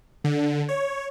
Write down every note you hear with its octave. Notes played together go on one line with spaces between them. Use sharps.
D3
C#5